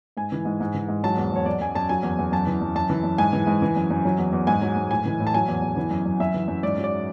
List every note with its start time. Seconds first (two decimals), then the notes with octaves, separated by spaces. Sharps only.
0.17 G#2 G#5
0.32 E3
0.45 G#2
0.60 G#2
0.74 E3
0.89 G#2
1.03 F#3 A5
1.17 E2
1.32 E2 C#5
1.46 F#3 D5
1.60 F#2 G#5
1.75 F#2 A5
1.89 F#3 G#5
2.03 E2
2.19 E2
2.32 F#2 A5
2.47 E3
2.61 F#2
2.75 F#2 A5
2.90 E3
3.04 F#2
3.18 G#2 G#5
3.33 E3
3.47 G#2
3.62 E3
3.76 F#2
3.91 F#2
4.05 F#3
4.19 E2
4.33 E2
4.47 G#2 G#5
4.62 F#3
4.76 G#2
4.91 A2 G#5
5.05 E3
5.20 A2
5.27 A5
5.34 F#3 G#5
5.48 E2
5.62 E2
5.76 E3
5.91 F#2
6.05 F#2
6.20 F#2 E5
6.34 E3
6.48 F#2
6.63 G#2 D5
6.78 F#3
6.84 D5